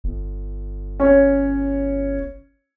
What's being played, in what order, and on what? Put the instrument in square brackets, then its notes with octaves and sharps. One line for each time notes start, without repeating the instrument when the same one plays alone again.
[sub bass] G1
[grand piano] C#4 C#5